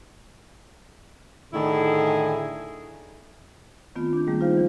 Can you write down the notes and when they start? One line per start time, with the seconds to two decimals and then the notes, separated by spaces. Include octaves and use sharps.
1.54 A2 D3 D#3 E4 G#4
3.96 D#3 A3 B3 C4 F4
4.13 D4 G6
4.27 D#3 G3 A3 A#3 G#4
4.40 D#4 F4 C5 F5
4.54 E3 F3